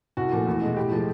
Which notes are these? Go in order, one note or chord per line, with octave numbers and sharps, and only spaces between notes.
C2 F#4
A#2 F3 A3
E2
B2 G#3
A2 G4
F3 G#3